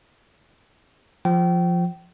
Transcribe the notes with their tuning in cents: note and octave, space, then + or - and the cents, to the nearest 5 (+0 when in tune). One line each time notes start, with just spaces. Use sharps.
F3 +0 G5 -30